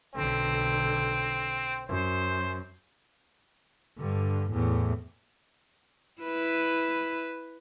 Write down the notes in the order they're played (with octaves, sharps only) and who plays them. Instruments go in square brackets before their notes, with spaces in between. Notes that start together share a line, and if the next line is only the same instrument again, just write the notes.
[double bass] B1 D3 [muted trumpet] C4
[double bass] F#2 [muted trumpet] C5
[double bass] G2 D3
E2 A2
[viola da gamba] E4 B4